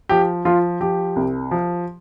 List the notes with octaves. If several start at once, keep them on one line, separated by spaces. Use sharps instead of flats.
F3 G4
F3 F4
F3 G4
C2
F3